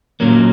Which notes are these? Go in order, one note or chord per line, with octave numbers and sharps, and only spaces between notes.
A#2 F#3 A#3 C#4